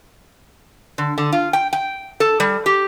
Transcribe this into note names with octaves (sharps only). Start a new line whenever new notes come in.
D3
D3
F4
G5
G5
A4
G3
G4